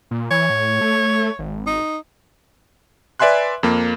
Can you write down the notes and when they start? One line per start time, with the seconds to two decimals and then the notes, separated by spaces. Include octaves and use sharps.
0.11 A#2
0.31 E3 C#5
0.50 A2
0.81 A3
1.39 G#1
1.66 D#4
3.19 B4 D5 E5 G#5 C6 F#6
3.63 F2 A#3